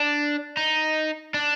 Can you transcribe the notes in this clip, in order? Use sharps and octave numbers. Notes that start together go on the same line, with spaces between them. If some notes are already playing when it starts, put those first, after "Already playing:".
Already playing: D4
D#4
D4